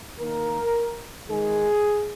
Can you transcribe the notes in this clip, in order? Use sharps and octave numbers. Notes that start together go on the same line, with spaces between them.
D#3 A#3 A#4
D#3 G#3 G#4